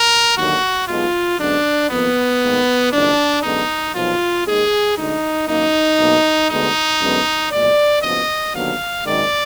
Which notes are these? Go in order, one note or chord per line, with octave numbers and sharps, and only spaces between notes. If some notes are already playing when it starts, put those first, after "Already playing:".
Already playing: A#4
D#2 D3 F#3 A#3 F#4
B1 B2 G#3 F4
F#2 D3 G#3 B3 D4
F2 D#3 A#3 B3
G#2 D#3 A#3
F#1 F2 D#3 D4
F#2 D3 G#3 B3 D#4
B1 A#2 F3 F4
D#2 D#3 G#3 G#4
D2 D3 G#3 D#4
F#2 D#3 A#3 D#4
B1 B2 A#3
D2 D3 G#3 B3 D#4
F#2 D3 G#3 B3
B1 A#2 G#3 D5
F#1 F#2 F3 B3 D#5
D#2 D3 F#3 B3 F5
G#1 F#2 D#3 G#3 D5